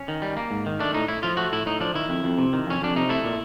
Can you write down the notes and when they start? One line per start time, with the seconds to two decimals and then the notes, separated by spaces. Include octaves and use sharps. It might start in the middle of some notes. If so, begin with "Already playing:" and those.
Already playing: C#4
0.08 D#3
0.22 G3
0.37 A#3
0.51 G#2
0.66 D#3
0.79 A3 D4
0.94 A2 D#4
1.08 A2 E4
1.23 F3 F4
1.37 A3 F#4
1.52 A2 E4
1.66 A2 D#4
1.80 F3 D4
1.95 D#3 E4
2.09 F2
2.24 F2
2.38 C3
2.53 D#3
2.67 F2 C#4
2.81 F2 D4
2.96 C3 D#4
3.09 A3 E4
3.25 A#2